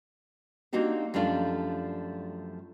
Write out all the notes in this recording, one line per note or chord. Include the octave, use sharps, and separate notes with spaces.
A#3 C4 D4 D#4 F#4 G4
F#2 F3 G3 A3 D4 F4